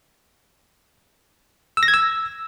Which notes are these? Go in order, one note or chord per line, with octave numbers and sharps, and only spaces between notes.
E6
A#6
G#6
E6